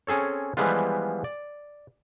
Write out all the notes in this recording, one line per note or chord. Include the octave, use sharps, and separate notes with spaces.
C4 C#4 G#4 A4 C#5
E3 F3 G3 G#3 B3 F4
D5